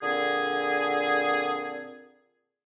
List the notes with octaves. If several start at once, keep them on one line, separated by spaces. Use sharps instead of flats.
A#2 D3 C4 G#4